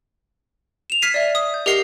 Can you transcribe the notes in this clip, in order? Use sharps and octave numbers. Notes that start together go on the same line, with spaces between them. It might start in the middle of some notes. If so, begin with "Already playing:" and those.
E7 F7
F6 G#6 B6 C7 D#7
D5 E5
D#6
G6
G4 A#4 D#5 F#5 C7